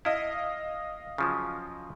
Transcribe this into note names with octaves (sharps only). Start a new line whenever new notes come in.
E4 D#5 F5
C#3 F3 F#3